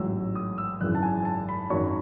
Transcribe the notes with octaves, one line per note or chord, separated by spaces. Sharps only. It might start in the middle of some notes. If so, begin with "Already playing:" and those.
Already playing: A1 G#2 F#3 E6
D#6
E6
G#1 F#2 C#3 E3 F#6
A5
G#5
A5
B5
G#1 F#2 D#3 F#3 C#6